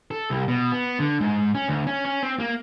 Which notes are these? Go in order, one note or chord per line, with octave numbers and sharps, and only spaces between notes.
A4
C2
B2
B3
D3
G#2
C#4
D2
C#4
C#4
C4
A#3